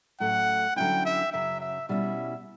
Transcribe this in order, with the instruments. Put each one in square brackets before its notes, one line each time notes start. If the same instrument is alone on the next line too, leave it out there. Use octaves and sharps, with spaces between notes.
[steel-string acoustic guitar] A2 F#3 A3 C#4 [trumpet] F#5
[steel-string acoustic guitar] D3 F#3 C#4 E4 [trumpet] G5
[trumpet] E5
[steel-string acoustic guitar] F#2 C#3 F#3 [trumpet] E5
[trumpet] E5
[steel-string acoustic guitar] B2 G3 C#4 E4 [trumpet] E5